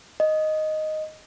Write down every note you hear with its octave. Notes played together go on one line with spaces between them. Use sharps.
D#5